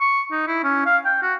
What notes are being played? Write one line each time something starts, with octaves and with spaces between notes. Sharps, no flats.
C#6
D#4
E4
C#4
F5
G5
F#4